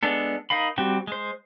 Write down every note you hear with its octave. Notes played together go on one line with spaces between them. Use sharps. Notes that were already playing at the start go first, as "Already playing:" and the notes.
G#3 B3 D4 A4
D#4 A#4 F5 B5
G3 C4 F#4 G4
G#3 C5